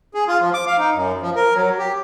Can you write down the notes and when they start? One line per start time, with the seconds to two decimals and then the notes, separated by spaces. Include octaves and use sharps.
0.14 G#4
0.28 F4
0.41 F3
0.54 D6
0.67 F5
0.79 D#4
0.93 F#2
1.21 F3
1.36 A#4
1.54 F#3
1.78 G4